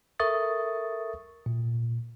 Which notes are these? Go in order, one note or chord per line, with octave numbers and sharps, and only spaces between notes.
A4 A#4 E5 C#6 D#6 A6
A#2